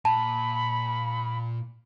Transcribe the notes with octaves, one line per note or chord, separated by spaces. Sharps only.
A#2 A5 B5